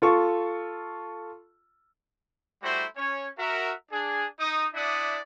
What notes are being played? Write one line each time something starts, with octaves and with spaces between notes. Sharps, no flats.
F4 A4 C#6
G3 A3 E4 F#4 C5
C#4 C#5
F#4 A#4 E5
D4 G#4
D#4 D#6
D4 E4 D5 E5 F#5 D#6